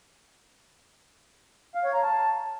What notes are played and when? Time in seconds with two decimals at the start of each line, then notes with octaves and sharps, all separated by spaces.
1.75 F5
1.84 C#5
1.93 A#5
2.02 A5